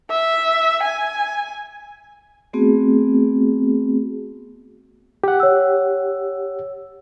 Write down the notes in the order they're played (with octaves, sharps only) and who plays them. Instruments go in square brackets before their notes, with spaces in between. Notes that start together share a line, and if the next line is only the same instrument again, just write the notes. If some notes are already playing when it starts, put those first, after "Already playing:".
[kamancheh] E5
G#5
[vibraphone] A3 B3 C4 F#4 G#4
[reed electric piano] G4 F#5
[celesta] C#5 E6